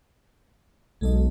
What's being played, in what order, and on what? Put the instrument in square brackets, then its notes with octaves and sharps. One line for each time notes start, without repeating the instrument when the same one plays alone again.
[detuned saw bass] B1 [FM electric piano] G#3 A4 D#5